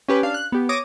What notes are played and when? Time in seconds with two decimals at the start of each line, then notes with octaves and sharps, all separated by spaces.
0.08 C#4 G4 B4
0.23 D4 F5
0.34 F#6
0.52 B3 G4
0.69 C#5 D6 D#6 A#6